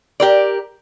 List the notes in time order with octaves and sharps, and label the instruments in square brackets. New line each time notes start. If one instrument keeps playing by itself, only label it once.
[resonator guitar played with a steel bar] G4 A#4 D5